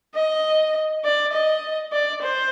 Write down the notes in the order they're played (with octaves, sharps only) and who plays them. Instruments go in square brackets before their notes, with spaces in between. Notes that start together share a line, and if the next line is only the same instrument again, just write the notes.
[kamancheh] D#5
D5
D#5
D5
C5